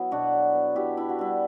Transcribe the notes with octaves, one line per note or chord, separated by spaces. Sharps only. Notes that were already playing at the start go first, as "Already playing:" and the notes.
Already playing: F#3 B3 E4
B2 D4 F#4
F#3
B3
B2 E4 G4
D4 E4
F#4
G3 E4